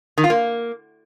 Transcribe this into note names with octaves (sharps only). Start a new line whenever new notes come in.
D#3
F4
A#3